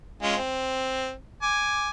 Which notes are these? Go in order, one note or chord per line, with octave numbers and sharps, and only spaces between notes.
G#3 C#4 F4
C4
G#5 D6